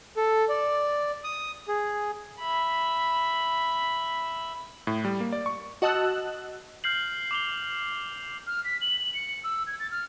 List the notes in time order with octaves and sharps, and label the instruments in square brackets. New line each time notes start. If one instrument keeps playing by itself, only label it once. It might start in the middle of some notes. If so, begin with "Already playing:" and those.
[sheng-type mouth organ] A4
D5
D#6
G#4
[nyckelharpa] E5 B5
[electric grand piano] A2
G3
A#3
D5
C#6
[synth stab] F#4 D#5 A5 E6 F#6
[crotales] F6 G6 C7 F#7
D6 F7 G7
[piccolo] F6
B6
F#7
F#7
C#7
E6
G#6
A6
F6